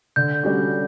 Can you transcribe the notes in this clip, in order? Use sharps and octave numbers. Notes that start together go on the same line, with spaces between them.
D3 G6
G3 C#4 F#4